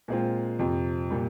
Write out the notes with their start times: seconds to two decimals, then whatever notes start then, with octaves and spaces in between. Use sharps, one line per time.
0.08 A#2 G#3 C4 F4
0.59 F2 C3 F3
1.10 A#2 G3